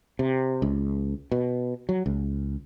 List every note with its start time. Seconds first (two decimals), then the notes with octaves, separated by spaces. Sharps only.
0.19 C3
0.62 C#2
1.32 B2
1.89 F#3
2.06 C#2